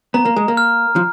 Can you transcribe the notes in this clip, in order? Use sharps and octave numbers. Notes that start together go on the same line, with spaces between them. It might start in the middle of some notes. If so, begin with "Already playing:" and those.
B3 A#5
A#3
G#3
A#3
F6
F3